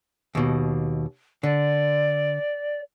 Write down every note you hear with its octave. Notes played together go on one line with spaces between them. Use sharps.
D#2 B2
D3 D5